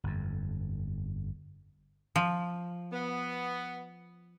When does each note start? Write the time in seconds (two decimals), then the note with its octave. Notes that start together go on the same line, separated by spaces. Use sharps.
0.04 G1 F2
2.16 F3
2.92 B3